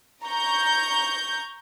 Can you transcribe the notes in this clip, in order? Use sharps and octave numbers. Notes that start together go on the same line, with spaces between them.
A#5 C#6 G6